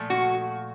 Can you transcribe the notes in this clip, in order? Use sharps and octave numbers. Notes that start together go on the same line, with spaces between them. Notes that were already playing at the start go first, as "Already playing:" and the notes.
Already playing: A#2 F3 A3
F#4